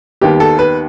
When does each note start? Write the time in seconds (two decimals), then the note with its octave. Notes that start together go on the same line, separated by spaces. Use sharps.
0.21 D#2 D#3 G3 B3 G4
0.40 A4
0.59 B4